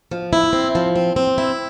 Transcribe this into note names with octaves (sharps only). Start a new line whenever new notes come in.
F3
E4
C4
F3
C4
C4
E4